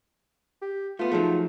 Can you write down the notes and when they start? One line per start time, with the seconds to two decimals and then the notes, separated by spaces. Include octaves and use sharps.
0.62 G4
0.99 A3 B3 F4
1.11 F3 F#3 A3 D#4 G#4